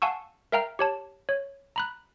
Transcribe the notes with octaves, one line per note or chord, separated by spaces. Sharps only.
F5 F#5 G#5 A5 C#6 E6
A#4 E5 F5 G5 A#5 F6
G4 C#5 A5
C#5
A#5 B5 F#6